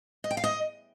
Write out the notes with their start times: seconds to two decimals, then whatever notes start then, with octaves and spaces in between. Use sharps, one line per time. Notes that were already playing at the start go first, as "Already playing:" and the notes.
0.24 D#5
0.31 G5
0.37 F5
0.44 D#5